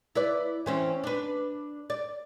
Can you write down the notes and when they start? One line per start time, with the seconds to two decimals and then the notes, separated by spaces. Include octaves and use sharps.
0.15 E4 B4 D5
0.66 E3 C4 C#4
1.04 D4 B4
1.90 D5